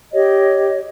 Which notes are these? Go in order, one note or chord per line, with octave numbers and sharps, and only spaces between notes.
G4 C#5 D#5